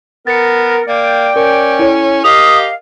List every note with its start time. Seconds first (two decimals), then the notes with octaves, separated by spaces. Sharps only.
0.27 B3 A#4 A6 C#7
0.88 A#3 D5 G5
1.36 C#4 A#4
1.79 E4 A4 C#5
2.24 G4 A#4 D#5 F5 D#6 F7